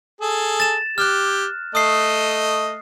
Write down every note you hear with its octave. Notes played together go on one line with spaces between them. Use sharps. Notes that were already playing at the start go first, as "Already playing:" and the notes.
G#4 A4
A6 E7
G4 F6 F#6
A3 D#5 D#6 C7